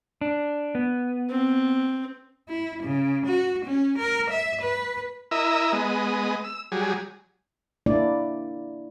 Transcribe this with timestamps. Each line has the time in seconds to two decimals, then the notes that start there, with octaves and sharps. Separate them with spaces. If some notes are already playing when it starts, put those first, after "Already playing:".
0.21 D4
0.75 B3
1.30 C4
2.49 E4
2.83 C#3
3.26 F#4
3.65 C#4
3.98 A#4
4.30 E5
4.62 B4
5.31 E4 A#4 D#5 E5
5.72 G#3 B3 D#5
6.44 E6
6.72 F#3 G3 G#4
7.86 A#3 D4 E4 D5